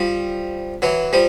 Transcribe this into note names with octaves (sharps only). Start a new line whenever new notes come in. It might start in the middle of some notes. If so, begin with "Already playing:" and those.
Already playing: F3 G3
E3 F#3
F3 G3